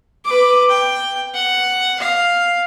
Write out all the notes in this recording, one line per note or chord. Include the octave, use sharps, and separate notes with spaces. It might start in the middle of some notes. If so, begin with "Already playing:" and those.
B4 D6
G5
F#5
F5